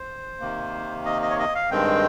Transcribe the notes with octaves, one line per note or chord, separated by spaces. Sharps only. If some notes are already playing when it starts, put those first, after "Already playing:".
Already playing: C5
C3 D#3 A#3
D#5
D#5
C#5
D#5
F5
G2 D#3 G#3 C4 G5